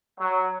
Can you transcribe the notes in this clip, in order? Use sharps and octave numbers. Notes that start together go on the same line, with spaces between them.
F#3